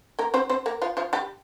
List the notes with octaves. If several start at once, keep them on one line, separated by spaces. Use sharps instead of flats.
A#3 A#4
C4 C5
C4 C5
A#3 A#4
F3 F4
F3 F4
G3 G4